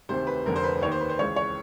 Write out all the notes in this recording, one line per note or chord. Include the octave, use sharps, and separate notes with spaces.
D2 C3 D#3 C5
B4
F1 F2 D3 A#4
C5
B4
D#2 D#3 C#5
C5
B4
C5
C#2 C#3 E3 C#5
C#5